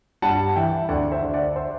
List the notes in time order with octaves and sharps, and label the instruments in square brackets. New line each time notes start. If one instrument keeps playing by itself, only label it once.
[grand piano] G2 F#5 A5
E3 E5 G5
D2 D5 F#5
C5 E5
D3
D5 F#5
C5 E5